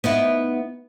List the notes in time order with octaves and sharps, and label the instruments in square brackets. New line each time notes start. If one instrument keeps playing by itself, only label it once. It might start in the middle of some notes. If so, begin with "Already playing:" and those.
[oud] B3 D#4 E4